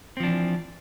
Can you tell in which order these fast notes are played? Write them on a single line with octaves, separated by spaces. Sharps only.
C4 F3 D4 E3